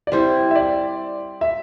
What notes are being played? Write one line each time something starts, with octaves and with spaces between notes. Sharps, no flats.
D5
G3 C4 E4 C5
E5
D5
E5